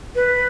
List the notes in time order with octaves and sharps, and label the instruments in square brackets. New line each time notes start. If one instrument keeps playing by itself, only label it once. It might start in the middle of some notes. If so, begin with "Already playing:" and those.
[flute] B4